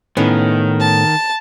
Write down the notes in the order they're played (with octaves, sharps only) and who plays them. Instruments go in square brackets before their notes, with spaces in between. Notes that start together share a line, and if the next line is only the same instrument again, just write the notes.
[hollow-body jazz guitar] A2 B3 C#4 [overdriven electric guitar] D#3
[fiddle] A5